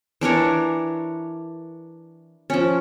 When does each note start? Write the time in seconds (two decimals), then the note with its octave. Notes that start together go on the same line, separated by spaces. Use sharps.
0.21 E3 D4 A#4 C#5
2.50 F3 C#4